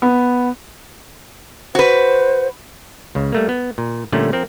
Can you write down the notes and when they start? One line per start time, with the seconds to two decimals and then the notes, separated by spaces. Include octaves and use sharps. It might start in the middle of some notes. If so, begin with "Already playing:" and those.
0.02 B3
1.75 F#4 B4 C5
3.15 C#2 C#3
3.32 G3 A3 A#3
3.49 B3
3.78 A#2
4.12 A#2 D3 G3 A3 C#4 F#5
4.33 F3 C4 A#4